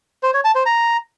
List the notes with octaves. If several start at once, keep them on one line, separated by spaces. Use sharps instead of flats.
C5
C#5
A5
C5
A#5